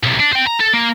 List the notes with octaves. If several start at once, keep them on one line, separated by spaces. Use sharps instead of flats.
B1 C3
D4
C5 G5
A#5
A4
A#3